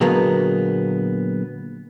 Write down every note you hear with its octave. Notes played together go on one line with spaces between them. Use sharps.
A#2 D3 F#3 G#3 A#3 B3